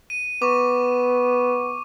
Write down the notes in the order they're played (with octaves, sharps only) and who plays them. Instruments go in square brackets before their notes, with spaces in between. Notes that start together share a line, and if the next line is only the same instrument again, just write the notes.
[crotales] D#7
[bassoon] B3 [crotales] C#6 D6